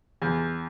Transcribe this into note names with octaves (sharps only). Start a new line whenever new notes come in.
E2